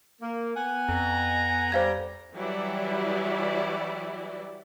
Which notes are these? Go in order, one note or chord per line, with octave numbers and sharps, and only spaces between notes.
A#3
B3 F#5 G#5
F2 A#5
G3 G4 C5 F5 G#6
E3 F#3 G3 E4 G4 D5